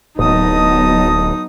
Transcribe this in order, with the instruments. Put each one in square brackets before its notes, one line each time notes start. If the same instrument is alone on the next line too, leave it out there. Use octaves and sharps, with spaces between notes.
[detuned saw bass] D1 [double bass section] F#3 B3 [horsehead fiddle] D#4 [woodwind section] D#5 A5 D#6